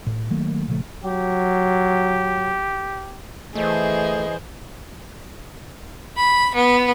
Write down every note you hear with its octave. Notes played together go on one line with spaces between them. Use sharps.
A2
D#3 F#3 A3 A#3
A#2 C#3 F3 A3
F#3 G4
E3 A3 G#4 C5 D#5
B5
B3